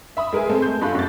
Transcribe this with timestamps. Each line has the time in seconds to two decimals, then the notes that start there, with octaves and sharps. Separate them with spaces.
0.17 E5 B5 D#6
0.33 G#3 A#4 B4 G#5
0.49 G#3 A3 C4 A4
0.62 G6
0.81 G2 A3 F4 A4 B5 F#6
0.94 F#2 A6